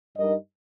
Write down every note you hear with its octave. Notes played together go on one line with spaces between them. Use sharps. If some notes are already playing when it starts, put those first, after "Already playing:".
G2 G3 D#4 A#4 D#5